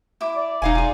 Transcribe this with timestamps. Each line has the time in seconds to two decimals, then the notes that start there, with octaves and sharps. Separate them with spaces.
0.21 E4 D6
0.36 D5
0.62 E1 D#4 F5 G#5
0.75 F4 G#4